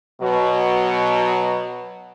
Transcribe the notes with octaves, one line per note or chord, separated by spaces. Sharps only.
B2 F#3